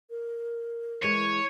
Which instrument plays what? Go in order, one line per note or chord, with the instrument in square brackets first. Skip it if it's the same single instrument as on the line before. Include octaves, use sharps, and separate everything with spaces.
[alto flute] A#4
[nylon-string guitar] E3 G#3 [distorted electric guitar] C#5 [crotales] C#7 D#7